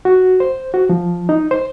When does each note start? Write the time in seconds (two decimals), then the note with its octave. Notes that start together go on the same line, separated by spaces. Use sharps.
0.05 F#4
0.40 C5
0.74 F#4
0.89 F3
1.29 D#4
1.51 C5